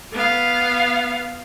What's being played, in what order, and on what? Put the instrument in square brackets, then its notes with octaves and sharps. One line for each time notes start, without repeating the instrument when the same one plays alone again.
[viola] B3 F5